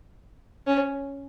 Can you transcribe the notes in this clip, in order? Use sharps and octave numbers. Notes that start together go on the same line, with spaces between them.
C#4